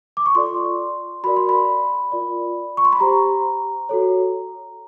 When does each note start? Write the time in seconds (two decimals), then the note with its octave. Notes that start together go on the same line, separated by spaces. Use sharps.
0.17 D6
0.26 C#6
0.35 F4 A4 D5 C6
1.24 F#4 A#4 D5 B5
1.37 C6
1.49 B5
2.12 F4 A#4 D5
2.77 C#6
2.85 C6
2.93 B5
3.00 G4 C5 A#5
3.89 F#4 A4 C#5